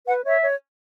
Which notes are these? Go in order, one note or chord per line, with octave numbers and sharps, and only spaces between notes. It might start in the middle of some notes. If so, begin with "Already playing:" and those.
B4 F#5
C#5 E5
C#5